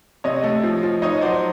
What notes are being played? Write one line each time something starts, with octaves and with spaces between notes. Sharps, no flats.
C3 C#5 D#5
A3
F3
F3
D#4 C#5 D#5
F#3 C5 D5